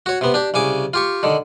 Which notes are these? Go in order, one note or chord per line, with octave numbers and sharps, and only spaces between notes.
F#4 C#5
C3 B3
D4 G4
C2 C#3 G#5 D6
F4 G4 C#6
D3 D#3